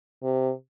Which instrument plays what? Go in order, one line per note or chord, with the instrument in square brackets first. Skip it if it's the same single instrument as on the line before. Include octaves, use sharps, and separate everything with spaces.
[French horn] C3